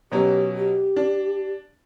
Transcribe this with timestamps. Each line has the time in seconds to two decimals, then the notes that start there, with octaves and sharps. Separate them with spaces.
0.12 B2 F#3 C#4 G4
0.56 G4
0.96 D4